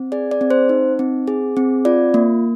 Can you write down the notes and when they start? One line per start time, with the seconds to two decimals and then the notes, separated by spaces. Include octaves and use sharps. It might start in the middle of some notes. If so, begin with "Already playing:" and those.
Already playing: C4
0.12 G#4 D5
0.31 D5
0.41 C4
0.50 C5
0.69 D#4
0.99 C4
1.28 G#4
1.57 C4
1.85 F4 D5
2.14 A#3